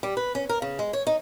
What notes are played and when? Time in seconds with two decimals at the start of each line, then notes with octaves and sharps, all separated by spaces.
0.03 G3
0.17 B4
0.35 C#4
0.49 A#4
0.62 C#3
0.79 G#3
0.93 C#5
1.07 D#4